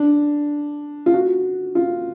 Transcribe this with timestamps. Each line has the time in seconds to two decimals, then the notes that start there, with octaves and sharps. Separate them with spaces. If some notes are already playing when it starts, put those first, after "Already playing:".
Already playing: D4
1.06 F4
1.14 F#4
1.75 F4